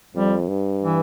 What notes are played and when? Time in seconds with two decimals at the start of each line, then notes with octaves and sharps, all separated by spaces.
0.15 F2 G3
0.48 G2
0.83 E3